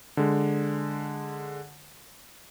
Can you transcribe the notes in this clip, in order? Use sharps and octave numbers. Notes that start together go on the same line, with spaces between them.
D3 G#3